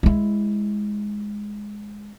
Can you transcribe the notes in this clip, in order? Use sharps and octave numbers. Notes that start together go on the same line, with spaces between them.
G#3 E4